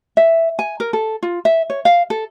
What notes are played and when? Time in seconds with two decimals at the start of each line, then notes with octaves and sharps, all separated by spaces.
0.17 E5
0.59 G#5
0.80 A#4
0.93 A4
1.23 F4
1.45 E5
1.70 C#5
1.85 F5
2.10 A4